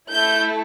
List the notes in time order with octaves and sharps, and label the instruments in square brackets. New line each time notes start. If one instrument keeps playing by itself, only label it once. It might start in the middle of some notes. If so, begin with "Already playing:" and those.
[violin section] A3 E4 A4 G6